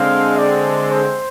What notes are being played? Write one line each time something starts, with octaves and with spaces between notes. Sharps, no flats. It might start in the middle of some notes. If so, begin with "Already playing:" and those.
Already playing: D3 G#3 C4 F5
D5
C5